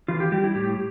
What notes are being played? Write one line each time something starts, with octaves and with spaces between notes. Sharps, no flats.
E3 F4
G4
G3 G4
E4
A2 G4